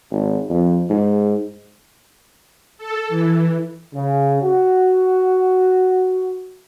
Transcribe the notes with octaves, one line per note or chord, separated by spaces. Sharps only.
G#1
F2
G#2
A4
E3
C#3
F#4